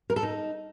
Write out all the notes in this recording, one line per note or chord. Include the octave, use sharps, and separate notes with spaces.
A#4
A4
D#4